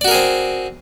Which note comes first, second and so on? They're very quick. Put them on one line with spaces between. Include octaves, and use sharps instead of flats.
D5 F#4 A#4 G#4 C4